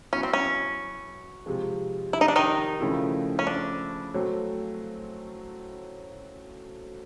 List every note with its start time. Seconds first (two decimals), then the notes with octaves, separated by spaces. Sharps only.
0.13 F#3 B3 C#4 E4
0.23 C4
0.33 C#4
1.46 C3 F3 G#3
2.13 E4
2.21 D#4
2.28 D4
2.36 D#3 D#4
2.80 C#3 F3 A3 C4 E4
3.39 C#4
3.47 D4
4.14 F#3 A3 C4